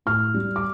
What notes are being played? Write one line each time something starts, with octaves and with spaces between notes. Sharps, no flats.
A2 F6
G3
D6